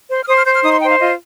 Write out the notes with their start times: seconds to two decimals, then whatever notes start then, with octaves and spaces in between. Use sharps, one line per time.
0.09 C5
0.23 F6
0.28 C5 D#6
0.36 F6
0.45 C5 G6
0.54 F6
0.64 D#4 D#6
0.73 C6
0.81 C5 G5
0.90 F5
0.99 F4 D#5